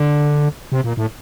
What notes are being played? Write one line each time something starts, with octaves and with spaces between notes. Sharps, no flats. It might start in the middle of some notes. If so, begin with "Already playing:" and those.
Already playing: D3
C3
A#2
A2